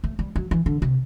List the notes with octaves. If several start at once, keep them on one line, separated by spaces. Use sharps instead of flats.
A3
G3
F#3
E3
D3
C3